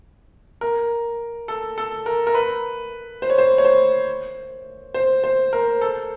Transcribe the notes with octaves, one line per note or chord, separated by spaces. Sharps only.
A#4
A4
A4
A#4
A#4
B4
C5
C#5
C5
C#5
C5
C5
C5
A#4
A4